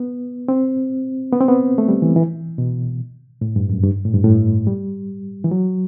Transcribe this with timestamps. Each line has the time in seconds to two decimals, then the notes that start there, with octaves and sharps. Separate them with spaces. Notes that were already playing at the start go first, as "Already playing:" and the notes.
Already playing: B3
0.48 C4
1.33 B3
1.40 C4
1.48 B3
1.78 A3
1.88 G3
2.02 E3
2.16 E3
2.58 B2
3.41 A2
3.56 G2
3.69 F#2
3.83 G2
4.05 A2
4.14 G2
4.24 A2
4.67 G3
5.44 E3
5.51 F#3